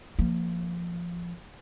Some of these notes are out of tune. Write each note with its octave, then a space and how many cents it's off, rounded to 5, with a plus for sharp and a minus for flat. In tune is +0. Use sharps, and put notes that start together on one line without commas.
F3 -15 A#3 -20